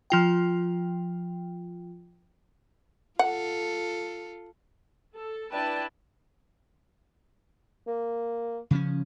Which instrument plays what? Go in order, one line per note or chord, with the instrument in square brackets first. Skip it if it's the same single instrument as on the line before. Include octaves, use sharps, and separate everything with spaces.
[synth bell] F3 F4 G5
[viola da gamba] F4 A4 [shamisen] F#5
[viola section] A4
D4 E4 B4 D5 G5 A5
[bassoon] A#3
[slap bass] C#3 F3 C#4